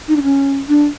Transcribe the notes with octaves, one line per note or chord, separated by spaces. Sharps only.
D#4
D4
C#4
D4